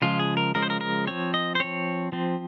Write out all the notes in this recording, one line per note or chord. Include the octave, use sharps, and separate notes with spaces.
C#3 F3 G#3 F4
G#4
A#4
C#3 F3 G#3 A#4
C5
A#4
A#4
F3 C4 C#5
D#5
C5
F3 C4 C#5
F3 C4